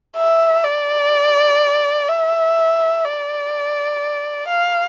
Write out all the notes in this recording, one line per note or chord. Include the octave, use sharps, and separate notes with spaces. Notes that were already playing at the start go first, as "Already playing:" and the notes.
E5
D5
E5
D5
F5